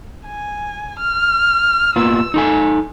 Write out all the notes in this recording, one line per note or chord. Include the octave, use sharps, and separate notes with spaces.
G#5
F6
A#3 B3 F4 E6
D#4 A4 G#5